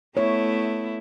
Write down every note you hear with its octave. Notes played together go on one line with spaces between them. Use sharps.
A3 B3 E4 C#5